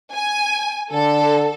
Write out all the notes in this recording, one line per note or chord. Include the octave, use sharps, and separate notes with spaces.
G#5
D3 A4